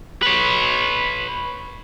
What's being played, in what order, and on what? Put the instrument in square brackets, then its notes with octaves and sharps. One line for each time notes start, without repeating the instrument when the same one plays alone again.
[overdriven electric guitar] B4 C#5